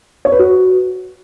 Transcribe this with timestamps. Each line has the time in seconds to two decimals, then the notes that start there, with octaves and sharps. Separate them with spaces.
0.25 C#5
0.32 B4
0.39 F#4